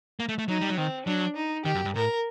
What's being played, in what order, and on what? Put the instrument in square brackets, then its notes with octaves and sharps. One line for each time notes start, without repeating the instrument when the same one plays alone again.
[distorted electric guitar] A#3
A3
A3
[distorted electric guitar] F#3 [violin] D#4
[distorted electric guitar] G3
F#3
[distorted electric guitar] D#3 [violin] C4
[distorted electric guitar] F#3 [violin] D4
[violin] D#4
[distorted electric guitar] D#3 [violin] G4
[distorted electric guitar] F#2
G2
[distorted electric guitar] A2 [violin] A#4